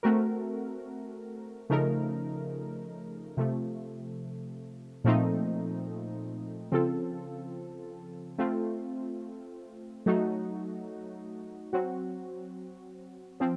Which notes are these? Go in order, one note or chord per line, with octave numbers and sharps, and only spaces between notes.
A3 C4 F#4 A#4
C#3 F3 A3 D#4 A#4
C3 F3 A3
A#2 F3 A3 C4 D#4
C#3 F3 C4 F4 A4
A3 C4 F4
F#3 A3 D#4 F#4
F#3 C4 F#4
F3 C4